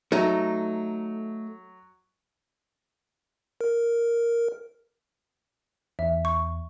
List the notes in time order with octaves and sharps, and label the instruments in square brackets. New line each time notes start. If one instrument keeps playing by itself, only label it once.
[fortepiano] F#3 [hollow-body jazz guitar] A3 D#4
[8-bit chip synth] A#4
[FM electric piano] E2 [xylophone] E5
[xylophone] C#6